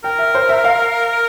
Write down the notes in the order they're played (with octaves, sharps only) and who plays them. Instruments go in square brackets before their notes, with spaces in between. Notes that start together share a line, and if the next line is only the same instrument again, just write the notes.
[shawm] A#4 [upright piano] G5
[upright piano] E5
C5
E5
F5